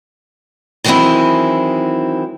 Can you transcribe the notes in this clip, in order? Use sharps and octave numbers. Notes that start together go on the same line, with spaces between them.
D#3 E3 F#3 G#3 C4 E4